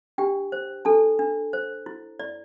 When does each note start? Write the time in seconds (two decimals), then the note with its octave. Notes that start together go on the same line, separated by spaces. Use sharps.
0.18 D4 G4 G5
0.52 C5
0.85 D4 A4 A5
1.19 D4
1.53 C5
1.86 E4
2.20 E4 D5